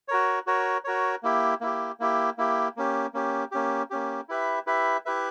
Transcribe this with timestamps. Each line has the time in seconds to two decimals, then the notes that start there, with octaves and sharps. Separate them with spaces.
0.08 F#4 A#4 C#5
0.47 F#4 A#4 C#5
0.84 F#4 A#4 C#5
1.23 A#3 E4 G4
1.61 A#3 E4 G4
2.00 A#3 E4 G4
2.38 A#3 E4 G4
2.76 A#3 C#4 G4
3.14 A#3 C#4 G4
3.52 A#3 C#4 G4
3.90 A#3 C#4 G4
4.29 E4 G4 B4 E5
4.67 E4 G4 B4 E5
5.05 E4 G4 B4 E5